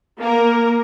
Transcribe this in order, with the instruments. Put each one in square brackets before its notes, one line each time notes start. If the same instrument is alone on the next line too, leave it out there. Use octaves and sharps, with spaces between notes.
[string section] A#3 A#4